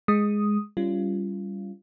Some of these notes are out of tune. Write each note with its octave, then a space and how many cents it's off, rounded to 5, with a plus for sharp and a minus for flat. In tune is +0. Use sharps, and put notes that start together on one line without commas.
G#3 +0 D#6 +0
G3 +0 C#4 +15 F4 -25